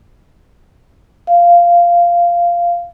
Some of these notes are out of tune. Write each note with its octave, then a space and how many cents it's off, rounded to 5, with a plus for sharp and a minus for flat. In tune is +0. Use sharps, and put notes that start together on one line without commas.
F5 -10